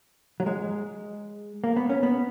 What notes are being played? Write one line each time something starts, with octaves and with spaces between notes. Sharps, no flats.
F#3
G#3
A#3
B3
C#4
B3